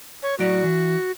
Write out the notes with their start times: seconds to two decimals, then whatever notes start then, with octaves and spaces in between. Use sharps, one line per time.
0.23 C#5
0.39 A2 F#3 F#4 D5
0.64 E3